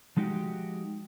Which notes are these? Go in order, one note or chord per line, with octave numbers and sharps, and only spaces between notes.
F3 G#3 D#4 F#4 G4